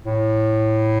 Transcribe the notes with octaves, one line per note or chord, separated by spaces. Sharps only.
A2